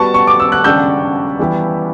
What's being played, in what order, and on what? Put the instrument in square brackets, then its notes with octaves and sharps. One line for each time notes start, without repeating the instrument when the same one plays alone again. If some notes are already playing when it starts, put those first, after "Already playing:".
Already playing: [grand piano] G3 B3 F#4 [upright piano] A5 C#6
[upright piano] C#6
D6
E6
F#6
[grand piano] C#3 G3 D4 G4 [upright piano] E6 G6
[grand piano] E3 G3 B3 E4 G4